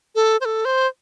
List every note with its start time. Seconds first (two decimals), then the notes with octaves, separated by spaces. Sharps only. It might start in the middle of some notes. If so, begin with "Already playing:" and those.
0.15 A4
0.41 C5
0.45 A4
0.65 C5